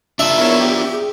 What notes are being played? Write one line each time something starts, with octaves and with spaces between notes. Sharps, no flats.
D4 F4 E5
B3 E4 A#4 C#5
G4
G#4